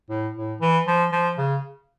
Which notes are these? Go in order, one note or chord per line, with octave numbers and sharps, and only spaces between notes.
A2
A2
E3
F3
F3
C#3